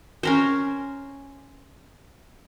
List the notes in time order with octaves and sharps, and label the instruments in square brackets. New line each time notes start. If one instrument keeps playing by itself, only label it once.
[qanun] C#4 A#4 C5